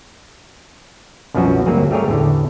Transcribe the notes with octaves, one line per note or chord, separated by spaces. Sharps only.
C2 F#2 B2 F3 C#4 F#4
D2 G2 F#3 A#3 C4 G#4
G3 A3 G4 G#4 A#4 C#5
A1 E2 A2 D3